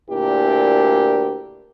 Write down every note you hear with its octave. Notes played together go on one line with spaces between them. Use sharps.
D2 A#2 D4 E4 G4 A#4